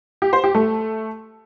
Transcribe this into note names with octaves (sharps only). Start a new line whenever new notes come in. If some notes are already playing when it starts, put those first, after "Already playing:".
G4
C5
G4
A3